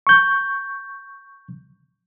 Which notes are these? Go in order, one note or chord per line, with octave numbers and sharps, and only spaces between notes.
C#6 G6